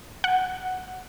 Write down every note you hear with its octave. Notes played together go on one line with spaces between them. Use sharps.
F#5